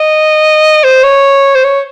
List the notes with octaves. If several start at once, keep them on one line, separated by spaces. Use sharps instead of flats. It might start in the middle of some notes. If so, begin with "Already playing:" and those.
Already playing: D#5
C5
C#5
C5
C#5